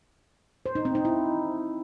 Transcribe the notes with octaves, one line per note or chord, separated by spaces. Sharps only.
C5
D#4
C4
D#4
E4